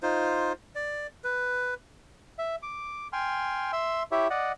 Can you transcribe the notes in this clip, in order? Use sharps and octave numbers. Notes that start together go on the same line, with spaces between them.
D#4 F4 C5
D5
B4
E5
D6
G5 G#5 C6 F6
E5 C6 E6
E4 G4 C#5 E5
D5 D#5 F#5